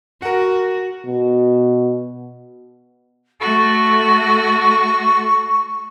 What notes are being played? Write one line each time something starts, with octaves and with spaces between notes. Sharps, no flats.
F#4 A#4 F#5
B2
A3 F#4 A4 C#6